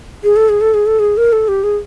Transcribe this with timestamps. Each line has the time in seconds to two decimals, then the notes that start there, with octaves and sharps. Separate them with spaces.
0.24 G#4
0.36 A4
0.49 G#4
0.61 A4
0.74 G#4
0.86 A4
0.99 G#4
1.17 A#4
1.32 A4
1.48 G4
1.64 G#4